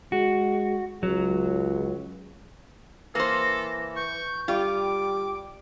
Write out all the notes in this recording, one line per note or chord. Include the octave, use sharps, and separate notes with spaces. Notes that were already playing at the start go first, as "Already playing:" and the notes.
G#3 F#4
C#2 F#3
E3 A#3 A4 C5 A#6
C#6 G6
G3 F4 G5 D6